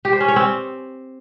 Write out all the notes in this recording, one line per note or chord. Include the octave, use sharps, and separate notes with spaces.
G4
C5
C#4
C#5
C4